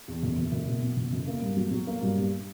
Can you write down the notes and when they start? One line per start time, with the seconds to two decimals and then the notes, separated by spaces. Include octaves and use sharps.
0.08 E2
0.23 F#1
0.38 F#1
0.52 F#1
0.67 B2
0.82 B2
0.97 F#1
1.13 F#1
1.27 A#3
1.42 G2
1.56 F#3
1.71 F#3
1.87 A#3
2.02 G2
2.17 G2